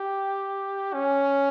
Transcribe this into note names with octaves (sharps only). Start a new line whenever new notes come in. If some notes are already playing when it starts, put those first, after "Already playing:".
Already playing: G4
C#4